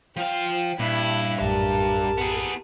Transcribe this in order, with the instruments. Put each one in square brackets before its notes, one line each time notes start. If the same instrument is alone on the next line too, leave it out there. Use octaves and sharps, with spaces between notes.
[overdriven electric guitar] F3 F5 [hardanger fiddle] G5
[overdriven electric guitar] G2 [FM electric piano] A#2 [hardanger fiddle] E4
[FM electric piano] A#1 F#2 A2 [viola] G4 A#4 [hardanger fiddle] A5
[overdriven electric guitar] B3 G#4